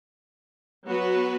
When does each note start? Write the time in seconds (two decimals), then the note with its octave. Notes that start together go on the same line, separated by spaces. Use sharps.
0.87 F#3 B3 F#4 B4